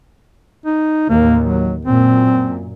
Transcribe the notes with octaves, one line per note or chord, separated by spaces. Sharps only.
D#4
A1 D#2 A#3
F#3
F#2 A#2 C4